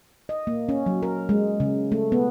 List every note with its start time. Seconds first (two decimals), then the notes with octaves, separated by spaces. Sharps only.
0.29 D#5
0.47 A#3
0.69 C#4
0.86 F#3
1.03 A#4
1.29 G#3
1.60 C#3
1.92 A3
2.12 B3